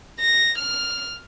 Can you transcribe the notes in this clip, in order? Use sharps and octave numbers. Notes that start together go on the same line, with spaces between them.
A#6
F6